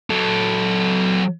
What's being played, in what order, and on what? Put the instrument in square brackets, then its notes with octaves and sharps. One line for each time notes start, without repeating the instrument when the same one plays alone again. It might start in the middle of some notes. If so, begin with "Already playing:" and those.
[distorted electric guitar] F#3 A4